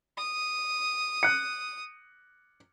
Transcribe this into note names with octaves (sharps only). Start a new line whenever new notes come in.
D#6
F#6 C#7